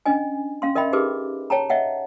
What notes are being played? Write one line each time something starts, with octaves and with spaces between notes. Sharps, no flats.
C#4 D4 D#5 G#5
C#4 F5 C6
A#4 D#5 E5 G5 B5
D#4 G4 G#4 A#4 B4 D6
C#5 G5 A5 A#5
C#5 D#5 E5 F#5 G5